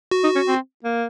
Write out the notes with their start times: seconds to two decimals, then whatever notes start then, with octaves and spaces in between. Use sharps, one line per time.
0.11 F#4
0.24 D#4
0.35 C#4
0.47 C4
0.84 A#3